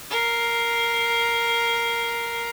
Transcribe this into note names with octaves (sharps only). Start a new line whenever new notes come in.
A#4 C7